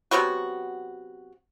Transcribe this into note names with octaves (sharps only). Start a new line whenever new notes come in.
C3 F#3 B3 F#4